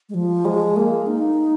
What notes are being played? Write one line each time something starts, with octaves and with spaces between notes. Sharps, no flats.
G#3
F3
G#3
A#3
D#4